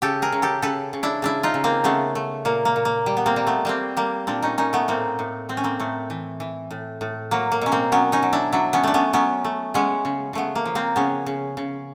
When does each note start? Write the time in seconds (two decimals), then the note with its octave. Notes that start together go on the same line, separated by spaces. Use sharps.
0.02 C#3 G4 A4
0.22 G#4 A#4
0.32 C#3
0.42 G4 A4
0.62 C#3 A4 B4
0.93 C#3
1.03 D4 E4
1.22 C#3 D4 E4
1.43 D#4 F4
1.54 C#3
1.64 A#3 C4
1.84 C#3 A3 B3
2.15 A3
2.45 A#2 A#3
2.65 A#3
2.76 A#2
2.85 A#3
3.06 G3
3.17 B3
3.26 A#3 C4
3.36 G3
3.47 A3 B3
3.65 G3 A#3 C4
3.97 G3 A#3
4.27 A#2 C4 D4
4.42 C#4 D#4
4.58 A#2 C#4 D#4
4.73 A3 B3
4.88 A2 A#3 C4
5.19 A2
5.49 A2 C4
5.57 C#4
5.64 A#3 C4
5.80 A2 A3
6.10 E3
6.40 E3
6.71 A2
7.01 A2
7.31 F#3 A#3
7.52 A#3
7.62 B2 C#4
7.72 A#3 C4
7.92 F#3 B3 C#4
8.12 C#4 D#4
8.23 F#3
8.33 D4 E4
8.52 F#3 D4 E4
8.73 B3 C#4
8.83 A3 D4
8.94 B3 C#4
9.13 F#3 B3 C#4
9.44 A3
9.74 G#3 B3 C#4
10.05 C#3
10.33 C#3 A3 B3
10.55 A#3
10.65 F3
10.75 A#3 C4
10.96 C#3 B3 C#4
11.26 C#3
11.57 C#3